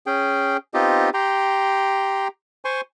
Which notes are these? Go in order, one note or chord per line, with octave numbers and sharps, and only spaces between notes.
C#4 G#4 G5
B3 C4 D#4 F4 G4 D#5
G4 G5 A#5 C6
C5 G#5 C6 C#6